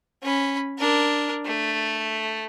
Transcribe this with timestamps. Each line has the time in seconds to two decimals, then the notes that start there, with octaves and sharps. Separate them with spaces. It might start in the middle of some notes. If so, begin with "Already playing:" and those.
0.23 C#4 B5
0.78 D4 A#4
1.45 A3